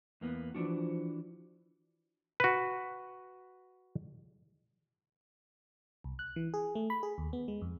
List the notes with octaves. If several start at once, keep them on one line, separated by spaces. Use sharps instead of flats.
E2 A#3 B3
E3 F3 D4 F#4
F#4 B4
C2
F#6
E3
G#4
A3
B5
G#4
D#2
B3
G#3
F2